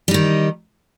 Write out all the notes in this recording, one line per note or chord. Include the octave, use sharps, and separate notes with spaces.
D#3 G3 D#4